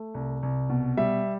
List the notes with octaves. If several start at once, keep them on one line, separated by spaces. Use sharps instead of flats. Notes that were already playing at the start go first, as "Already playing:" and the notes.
Already playing: A3
C2
C2
B2
G3 E5